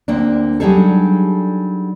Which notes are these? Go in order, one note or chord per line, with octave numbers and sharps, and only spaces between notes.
D2 A#3 C4 D4
F#3 G3 D4 D#4 G#4 A4